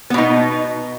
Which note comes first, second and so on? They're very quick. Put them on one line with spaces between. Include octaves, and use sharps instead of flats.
B3 B2 D#4